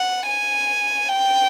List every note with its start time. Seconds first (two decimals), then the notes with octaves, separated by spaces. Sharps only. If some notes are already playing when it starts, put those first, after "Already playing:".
Already playing: F#5
0.27 G#5
1.09 G5